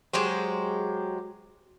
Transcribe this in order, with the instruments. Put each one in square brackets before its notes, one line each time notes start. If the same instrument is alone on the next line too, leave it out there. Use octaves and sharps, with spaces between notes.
[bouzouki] F#3 G#3 G4 C5